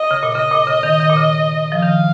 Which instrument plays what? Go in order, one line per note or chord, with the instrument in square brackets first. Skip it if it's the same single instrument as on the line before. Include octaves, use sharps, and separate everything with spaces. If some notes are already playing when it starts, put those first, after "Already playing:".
Already playing: [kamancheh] D#5
[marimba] C#3
A#2
[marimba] C#3 [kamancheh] D#5
[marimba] A#2
C#3
D#3
D#3
A#2
C#3
F3
[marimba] D#3 [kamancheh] F5